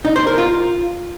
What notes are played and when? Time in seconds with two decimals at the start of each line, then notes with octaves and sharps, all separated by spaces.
0.05 D#4
0.16 C5
0.27 A#4
0.38 F4